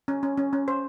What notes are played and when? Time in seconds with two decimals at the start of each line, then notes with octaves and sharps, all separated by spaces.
0.08 C#4
0.23 C#4
0.37 C#4
0.53 C#4
0.68 C5